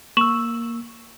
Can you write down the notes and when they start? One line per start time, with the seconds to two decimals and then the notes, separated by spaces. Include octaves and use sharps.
0.17 A#3 C#6 E6 E7 F#7